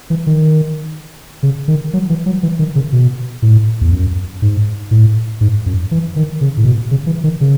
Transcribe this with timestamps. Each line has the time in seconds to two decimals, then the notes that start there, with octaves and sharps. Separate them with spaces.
0.10 E3
0.27 D#3
1.43 C#3
1.68 D#3
1.93 F#3
2.10 E3
2.26 F#3
2.43 E3
2.59 D#3
2.75 C#3
2.92 B2
3.42 A2
3.81 E2
3.92 F#2
4.42 G#2
4.91 A2
5.41 G#2
5.66 F#2
5.91 E3
6.16 D#3
6.41 C#3
6.57 A2
6.65 B2
6.91 C#3
7.07 E3
7.24 D#3
7.41 C#3